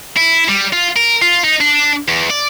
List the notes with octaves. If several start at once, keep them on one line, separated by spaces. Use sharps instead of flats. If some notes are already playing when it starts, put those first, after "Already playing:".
E4
G3
F4
A#4
F4
D#4
D4
E2
D5